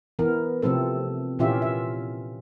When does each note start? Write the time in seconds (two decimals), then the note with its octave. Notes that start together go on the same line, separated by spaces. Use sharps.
0.19 E3 B3 A#4
0.62 C3 F3 A3 C4 A4
1.39 A#2 E3 C#4 F4 G4 E5
1.62 E5